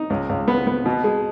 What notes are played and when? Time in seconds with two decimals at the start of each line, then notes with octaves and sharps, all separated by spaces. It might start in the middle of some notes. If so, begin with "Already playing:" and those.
Already playing: D#4
0.10 C#2
0.29 C#2
0.48 B3
0.67 B3
0.86 B2
1.04 G#3